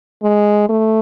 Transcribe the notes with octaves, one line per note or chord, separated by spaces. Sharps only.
G#3
A3